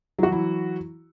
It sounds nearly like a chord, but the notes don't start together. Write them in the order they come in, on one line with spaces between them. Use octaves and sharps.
F#3 F#4 E3 E4